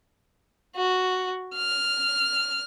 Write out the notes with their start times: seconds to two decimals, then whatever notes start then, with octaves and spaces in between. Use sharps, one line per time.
0.76 F#4
1.56 F6